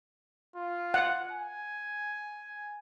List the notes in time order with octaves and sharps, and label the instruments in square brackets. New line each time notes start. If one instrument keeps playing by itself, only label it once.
[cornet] F4
[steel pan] F#5
[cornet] G#5